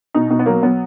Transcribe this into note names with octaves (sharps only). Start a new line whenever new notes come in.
B2 D#4
B2 D#4
B3
F#3 A#3
F#3 B3